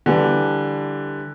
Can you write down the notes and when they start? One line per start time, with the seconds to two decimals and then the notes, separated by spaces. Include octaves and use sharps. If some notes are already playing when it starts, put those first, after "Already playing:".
0.06 D3 E3 G3